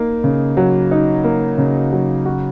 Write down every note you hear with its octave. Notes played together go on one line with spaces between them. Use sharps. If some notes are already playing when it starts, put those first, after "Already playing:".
Already playing: A#3 D#4
C#3
F#3
D#4
A#3
C#3
F#3
F#4